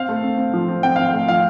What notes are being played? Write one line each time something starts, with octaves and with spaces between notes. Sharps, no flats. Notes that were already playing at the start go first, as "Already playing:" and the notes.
Already playing: C4 F5
A3
C4
C4
F3
C4
C4 G5
C4 F5
A3 G5
F3 F5